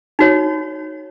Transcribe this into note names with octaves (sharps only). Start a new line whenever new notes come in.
D#4 F#4 C#5